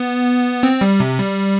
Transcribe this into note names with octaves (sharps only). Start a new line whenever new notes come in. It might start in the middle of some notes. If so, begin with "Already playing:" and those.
Already playing: B3
C4
G3
C3
G3